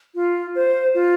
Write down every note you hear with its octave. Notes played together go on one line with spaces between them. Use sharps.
F4
C5
F4